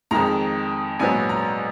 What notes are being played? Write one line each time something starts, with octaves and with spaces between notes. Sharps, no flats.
F2 D#3 G#3 A#5
A#1 G#2 F#3 B3 G#5
A#5